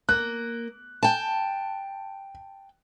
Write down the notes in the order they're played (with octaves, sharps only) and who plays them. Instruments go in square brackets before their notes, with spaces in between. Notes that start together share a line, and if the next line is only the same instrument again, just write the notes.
[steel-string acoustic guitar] A#3 [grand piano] F#6
[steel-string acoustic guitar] G5 A5